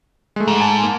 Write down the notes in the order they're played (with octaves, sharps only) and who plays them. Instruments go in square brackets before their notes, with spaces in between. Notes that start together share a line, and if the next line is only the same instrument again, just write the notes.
[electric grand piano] G#3 A3
[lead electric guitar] G#2
[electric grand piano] G#5 A5
A#3